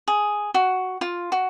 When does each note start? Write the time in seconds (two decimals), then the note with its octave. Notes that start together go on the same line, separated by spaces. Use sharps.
0.08 G#4
0.54 F#4
1.01 F4
1.32 F#4